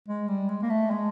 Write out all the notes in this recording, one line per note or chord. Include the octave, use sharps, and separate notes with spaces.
G#3
G3
G#3
A#3
A3
G#3